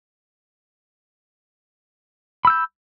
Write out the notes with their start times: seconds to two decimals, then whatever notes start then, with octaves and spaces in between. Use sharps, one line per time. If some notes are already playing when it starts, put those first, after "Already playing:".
2.45 B5
2.47 E6
2.50 G6